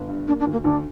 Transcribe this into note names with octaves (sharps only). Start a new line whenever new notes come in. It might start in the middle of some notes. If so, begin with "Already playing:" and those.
Already playing: G1
G2
A#3 D4
D4
D2
A#3
D2 D4